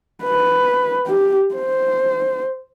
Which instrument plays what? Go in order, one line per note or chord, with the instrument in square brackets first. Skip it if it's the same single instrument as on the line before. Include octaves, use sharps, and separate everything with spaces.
[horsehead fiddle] B4
G4
C5